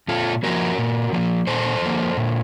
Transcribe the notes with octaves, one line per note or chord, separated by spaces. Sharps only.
A#2 F4 A4
F3 A#3 F#4 A#4
A#2
F3 A#3
A#2 A4 C5
F3 A#3
A#2